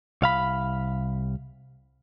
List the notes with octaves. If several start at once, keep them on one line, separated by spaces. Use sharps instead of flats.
C2 F5 B5